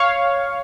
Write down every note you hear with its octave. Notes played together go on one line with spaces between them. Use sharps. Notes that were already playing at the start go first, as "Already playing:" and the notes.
Already playing: C#5 F5